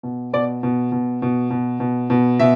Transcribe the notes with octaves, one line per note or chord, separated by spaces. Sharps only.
B2
B2 D5
B2
B2
B2
B2
B2
B2
B2 E5